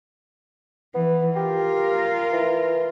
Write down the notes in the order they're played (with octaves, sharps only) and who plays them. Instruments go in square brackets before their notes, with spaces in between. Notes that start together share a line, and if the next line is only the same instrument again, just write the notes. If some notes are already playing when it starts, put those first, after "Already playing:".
[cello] E3 [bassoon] B3
[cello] F4 A#4 [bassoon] G4
[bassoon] E3